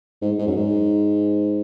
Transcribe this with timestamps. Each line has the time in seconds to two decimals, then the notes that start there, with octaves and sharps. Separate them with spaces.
0.22 G#2
0.39 G#2
0.47 F#2
0.56 G#2